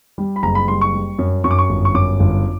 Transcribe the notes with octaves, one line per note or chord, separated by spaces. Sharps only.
G3
B5
F#1 A#5
B5
G3 C6
C#6
G3
F#2
F#2 C#6
D6
C#6
G1
C#6
F#2 D6
G1